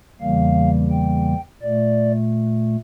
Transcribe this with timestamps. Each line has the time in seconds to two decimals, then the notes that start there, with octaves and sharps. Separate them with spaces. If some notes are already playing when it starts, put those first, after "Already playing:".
0.20 E2 C#3 E3 G3 A#3 F5
0.91 G5
1.62 A#2 A3 D5